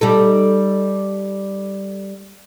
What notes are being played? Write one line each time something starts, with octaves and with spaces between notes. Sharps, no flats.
G3 D#4 A4